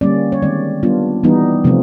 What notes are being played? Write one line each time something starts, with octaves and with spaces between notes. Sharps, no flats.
D3 G3 A#3 C#4 D5
C#5
D#3 G#3 C4 D5
G3 B3 D4 F4
E3 G3 B3 D#4
C3 F3 A3 C4 F4